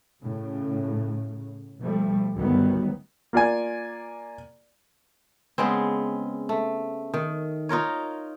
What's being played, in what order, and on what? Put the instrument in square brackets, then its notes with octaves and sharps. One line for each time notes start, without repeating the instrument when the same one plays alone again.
[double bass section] A2 C#3
B2 F3 G3 A3
D2 G2 D#3 F#3 G3 B3
[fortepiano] A#3 F4 D5 G#5
[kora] C#3 G#3 B3 C4
A3
D#3
D#4 F4 A#4 C#5